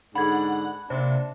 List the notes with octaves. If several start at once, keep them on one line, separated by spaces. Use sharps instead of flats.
G#2 D3 D4 F#5 B5 G#6
C3 A#3 D4